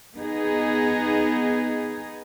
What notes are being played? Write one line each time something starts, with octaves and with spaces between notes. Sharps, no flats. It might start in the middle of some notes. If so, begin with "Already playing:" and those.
B3 D#4 G#4